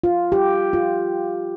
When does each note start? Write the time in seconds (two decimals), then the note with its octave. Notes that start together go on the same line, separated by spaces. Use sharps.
0.04 F4
0.32 G4
0.73 F4